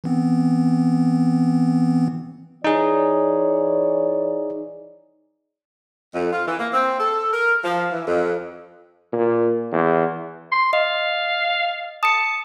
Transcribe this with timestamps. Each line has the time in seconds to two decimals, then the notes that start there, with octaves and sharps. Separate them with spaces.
0.04 E3 B3 C4
2.64 E3 D#4 G#4 C#5 D5
6.13 F2
6.32 F4
6.46 E3
6.59 A#3
6.72 C4
6.99 A4
7.32 A#4
7.63 F3
7.91 E3
8.06 F2
9.12 A#2
9.72 E2
10.52 C6
10.73 D#5 F5
12.03 A5 D#6 C#7